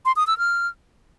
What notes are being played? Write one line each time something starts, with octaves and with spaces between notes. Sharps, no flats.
C6
D#6
E6
F6